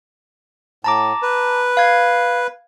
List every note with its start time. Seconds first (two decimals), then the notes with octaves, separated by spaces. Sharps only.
0.84 A2 A5 A#5 D6
1.23 B4
1.77 F5 G#6